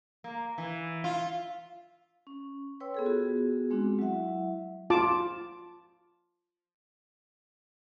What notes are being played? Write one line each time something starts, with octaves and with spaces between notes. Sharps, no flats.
A#3
E3
F4
C#4
B4 C#5 G5 C6 E6
B3 G#4 A4
B3 F4 F#4 G#4
G#3 C4 D4 F#4
F#3 E4 E5 F#5
F4 A5 D6